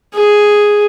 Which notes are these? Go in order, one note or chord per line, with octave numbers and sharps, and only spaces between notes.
G#4